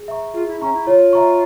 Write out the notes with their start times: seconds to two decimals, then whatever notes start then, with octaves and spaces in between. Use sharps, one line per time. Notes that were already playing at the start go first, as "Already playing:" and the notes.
Already playing: G#4
0.08 E5 A#5 C#6
0.34 F4 G#4
0.47 E4
0.61 C#4 E5 A#5 C#6
0.74 E4
0.86 F4 C#5
1.13 E5 A#5 C#6